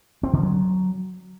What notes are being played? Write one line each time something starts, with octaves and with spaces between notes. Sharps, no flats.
C4
D3
F#3